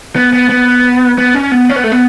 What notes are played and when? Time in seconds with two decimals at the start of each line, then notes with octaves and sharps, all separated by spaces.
0.16 B3
0.33 B3
0.49 B3
1.18 B3
1.35 C#4
1.51 B3
1.69 C#4
1.76 B3
1.84 A3
1.92 B3